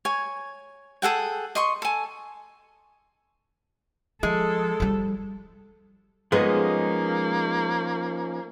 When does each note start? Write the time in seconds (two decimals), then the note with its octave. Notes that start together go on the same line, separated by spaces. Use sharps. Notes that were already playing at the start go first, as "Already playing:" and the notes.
0.05 C#5 G#5
1.02 G#4 A4 F#5 G5
1.55 D#5 C6 C#6
1.82 A4 G#5
4.23 F3 G#3 A4
4.80 F3 G3
6.32 F3 G#3 A#3 B3 C#4 D#4 G#4